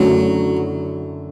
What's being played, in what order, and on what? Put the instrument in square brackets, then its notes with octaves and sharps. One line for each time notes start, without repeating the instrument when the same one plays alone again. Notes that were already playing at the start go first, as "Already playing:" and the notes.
Already playing: [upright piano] F#2 D3 A3 E4 [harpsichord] F#3